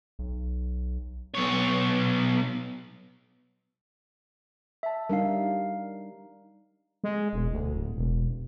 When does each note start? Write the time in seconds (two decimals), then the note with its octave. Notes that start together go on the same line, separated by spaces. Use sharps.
0.19 B1
1.34 B1 C#5
4.83 E5 A5
5.10 G3 D4 D#4 A#4 F5
7.04 G#3
7.33 E1
7.52 D2
7.75 D1
7.96 E1